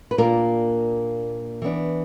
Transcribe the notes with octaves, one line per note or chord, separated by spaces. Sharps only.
B4
A#2 A#3 D4 A#4
E3 B3 D4